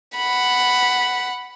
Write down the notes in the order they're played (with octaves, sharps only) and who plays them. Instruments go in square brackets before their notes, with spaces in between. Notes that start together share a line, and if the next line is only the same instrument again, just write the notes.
[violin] F#5 B5